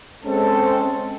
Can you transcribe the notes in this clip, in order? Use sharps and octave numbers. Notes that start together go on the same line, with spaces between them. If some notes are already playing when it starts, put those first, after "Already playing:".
G#3 C4 C#4 A4